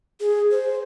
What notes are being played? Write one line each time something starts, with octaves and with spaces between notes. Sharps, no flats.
G#4
C5